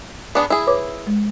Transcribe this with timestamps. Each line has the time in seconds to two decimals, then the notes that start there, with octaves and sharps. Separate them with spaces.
0.35 B3 D4 G#4 D6
0.50 E4 G#4
0.67 B4 C#5 D6
1.07 G#3